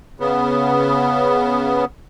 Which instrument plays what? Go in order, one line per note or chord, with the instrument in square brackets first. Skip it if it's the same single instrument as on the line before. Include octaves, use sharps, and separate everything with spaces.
[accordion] C#3 B3